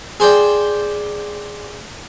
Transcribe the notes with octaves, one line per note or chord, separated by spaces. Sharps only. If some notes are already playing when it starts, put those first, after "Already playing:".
G#4 C5 D5 G5